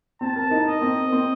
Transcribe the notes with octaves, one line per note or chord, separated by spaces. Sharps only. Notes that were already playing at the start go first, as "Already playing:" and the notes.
C4 A5
A#4
D#4
A#4 D#5
C4
A#4
C4